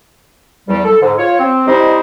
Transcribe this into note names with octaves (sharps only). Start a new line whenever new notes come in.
E2 G3
A4
G#2 D3
F4 C#5
C4
G3 C4 D#4 E4 C5 D#5